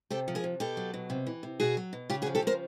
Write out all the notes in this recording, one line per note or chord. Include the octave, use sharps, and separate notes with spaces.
C3 G4 A4
F3
G#4 A#4
C3
B2 G4 A4
F#3
B2
C3
E3
C3
B2 F#4 G#4
F#3
B2
C#3 F4 G4
F#4 G#4
F3
G4 A4
C#3 A#4 C5